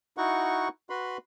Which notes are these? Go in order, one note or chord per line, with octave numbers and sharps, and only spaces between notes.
D#4 E4 F#4 F#5 C#6
F#4 B4 B5 C6